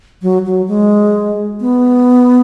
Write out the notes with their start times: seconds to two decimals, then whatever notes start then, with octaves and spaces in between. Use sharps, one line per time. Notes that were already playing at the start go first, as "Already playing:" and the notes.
0.22 F#3
0.46 F#3
0.68 G#3
1.61 B3